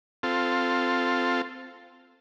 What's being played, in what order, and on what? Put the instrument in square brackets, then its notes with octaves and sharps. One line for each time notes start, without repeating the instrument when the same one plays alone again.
[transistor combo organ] C4 F4 A4